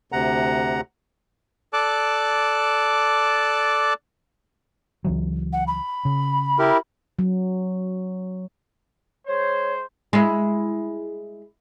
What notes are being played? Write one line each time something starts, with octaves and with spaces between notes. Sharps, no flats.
D2 C3 F#5 A#5
A4 D5 A5 D6 F#6
C#2 E3 F#3
F#5
B5
C#3
E4 G4 A#4
F#3
G#3 C5 C#5
G#3 E4